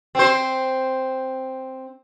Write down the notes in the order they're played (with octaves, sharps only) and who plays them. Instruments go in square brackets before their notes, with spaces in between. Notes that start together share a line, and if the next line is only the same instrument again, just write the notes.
[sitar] C4 C5